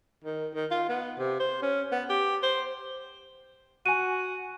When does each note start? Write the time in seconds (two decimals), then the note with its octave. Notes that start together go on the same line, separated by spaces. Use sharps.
0.24 D#3
0.54 D#3
0.71 F4
0.89 B3
1.18 C3
1.40 C5
1.62 C#4
1.92 B3
2.09 G4
2.42 C5
3.86 F#4 G#5 D#7